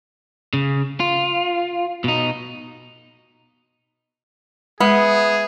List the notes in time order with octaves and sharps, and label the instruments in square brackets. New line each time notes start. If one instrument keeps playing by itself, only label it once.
[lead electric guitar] C#3
F4
B2 D#4
[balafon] G#3 [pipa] B3 [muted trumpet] G#4 [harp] E5